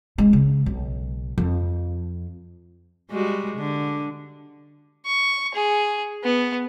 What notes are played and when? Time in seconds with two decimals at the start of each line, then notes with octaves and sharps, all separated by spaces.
0.18 G#3
0.33 C#3
0.66 B1
1.38 F2
3.11 G3 G#3 F#4
3.57 D3
5.06 C#6
5.55 G#4
6.24 B3